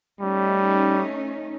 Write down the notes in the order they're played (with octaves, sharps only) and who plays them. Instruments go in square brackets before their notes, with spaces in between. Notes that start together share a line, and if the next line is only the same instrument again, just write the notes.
[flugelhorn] G3 [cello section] A3 C#4 D#4